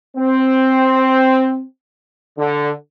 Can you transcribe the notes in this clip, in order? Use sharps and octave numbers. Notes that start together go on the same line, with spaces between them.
C4
D3